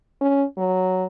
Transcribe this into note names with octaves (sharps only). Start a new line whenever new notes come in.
C#4
F#3